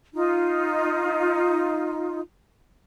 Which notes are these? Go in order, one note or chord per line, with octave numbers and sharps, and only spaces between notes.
D#4 F4